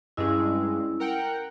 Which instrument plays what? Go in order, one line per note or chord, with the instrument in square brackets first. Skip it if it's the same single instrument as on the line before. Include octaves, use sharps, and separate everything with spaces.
[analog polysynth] G2 G#3 [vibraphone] C#4 E4
[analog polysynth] A#4 F#5 G5